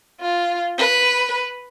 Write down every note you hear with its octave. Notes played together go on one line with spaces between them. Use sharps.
F4
B4